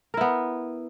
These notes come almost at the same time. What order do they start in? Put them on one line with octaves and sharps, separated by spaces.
A#4 E4 B3